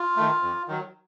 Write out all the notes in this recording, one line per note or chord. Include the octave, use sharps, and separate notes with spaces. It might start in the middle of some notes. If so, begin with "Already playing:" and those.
Already playing: F4
D#3 A3
F2
D#3 F#3